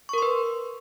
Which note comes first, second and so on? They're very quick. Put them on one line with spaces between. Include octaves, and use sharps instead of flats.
C#6 A#4 C6 B4